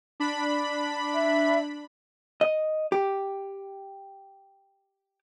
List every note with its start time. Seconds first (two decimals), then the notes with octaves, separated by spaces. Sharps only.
0.20 D4 B5
1.14 E5
2.41 D#5
2.92 G4